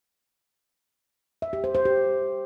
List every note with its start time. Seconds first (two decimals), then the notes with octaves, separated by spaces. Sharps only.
1.42 E5
1.53 G4
1.64 C5
1.75 C5
1.85 G4